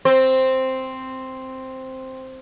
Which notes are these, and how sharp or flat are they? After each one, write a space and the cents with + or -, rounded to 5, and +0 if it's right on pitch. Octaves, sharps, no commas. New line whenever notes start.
C4 +0 C5 +0